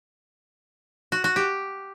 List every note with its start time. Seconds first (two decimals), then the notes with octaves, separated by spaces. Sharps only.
1.12 F#4
1.24 F#4
1.36 G4